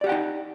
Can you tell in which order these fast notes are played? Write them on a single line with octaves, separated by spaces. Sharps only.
D5 G4 F#5 G5 D#4